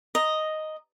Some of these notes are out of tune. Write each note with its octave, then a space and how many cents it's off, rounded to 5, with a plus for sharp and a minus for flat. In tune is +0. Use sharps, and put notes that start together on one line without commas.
D#5 +0 A#5 +0